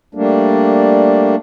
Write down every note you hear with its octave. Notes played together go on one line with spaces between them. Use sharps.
G3 A3 A#3 D4